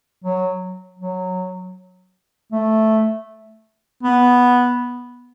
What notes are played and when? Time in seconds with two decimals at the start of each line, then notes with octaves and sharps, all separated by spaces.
0.24 F#3
0.99 F#3
2.52 A3
4.03 B3